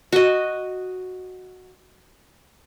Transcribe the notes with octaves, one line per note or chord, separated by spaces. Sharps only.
F#4 D#5